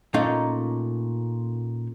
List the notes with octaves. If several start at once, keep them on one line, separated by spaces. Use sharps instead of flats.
A#2 A3 C#4 D#4 F5